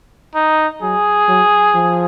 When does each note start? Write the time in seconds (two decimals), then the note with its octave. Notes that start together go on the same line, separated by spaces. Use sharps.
0.35 D#4
0.82 F#3 G#4
1.28 F#3
1.75 F3